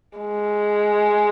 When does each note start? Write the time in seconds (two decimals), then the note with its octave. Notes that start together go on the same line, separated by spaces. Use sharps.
0.19 G#3